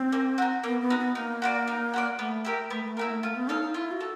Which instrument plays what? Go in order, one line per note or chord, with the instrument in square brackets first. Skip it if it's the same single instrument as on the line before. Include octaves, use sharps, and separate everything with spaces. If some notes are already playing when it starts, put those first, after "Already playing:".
Already playing: [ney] C4
[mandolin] A#3
D#4 F#4
[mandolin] A#3 [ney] B3
[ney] B3
[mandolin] D#4 F#4
[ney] B3
[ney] A#3 [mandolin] D#4
[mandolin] F#4 B4 D5
D#4
F#4 B4 D5
[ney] A3 [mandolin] B3
[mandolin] E4 G4 A#4
[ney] A3 [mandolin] B3
[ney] A3
[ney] A#3 [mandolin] E4 G4 A#4
[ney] A3
[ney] A3 [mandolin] F4
[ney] B3
[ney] D#4 [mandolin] A4 C#5 F5
[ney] D#4
[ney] E4 [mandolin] F4
[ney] F#4
[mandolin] A4